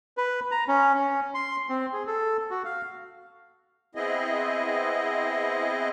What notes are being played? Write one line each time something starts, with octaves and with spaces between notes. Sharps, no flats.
B4
A#5
C#4
C#4
C6
C4
G#4
A4
F#4
F5
B3 C4 E4 G#4 D#5